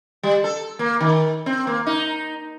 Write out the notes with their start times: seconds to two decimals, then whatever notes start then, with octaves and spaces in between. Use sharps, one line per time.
0.23 G3
0.44 A4
0.79 A#3
1.00 D#3
1.46 C4
1.67 A#3
1.86 D#4